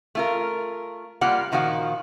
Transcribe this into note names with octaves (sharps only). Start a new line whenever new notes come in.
A3 F4 A#4
G3 A#3 F4 D5 F#5
A#2 D#3 F3 F#4 F5